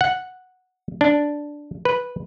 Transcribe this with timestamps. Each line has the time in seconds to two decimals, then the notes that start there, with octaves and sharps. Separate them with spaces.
0.01 F#5
1.01 D4
1.85 B4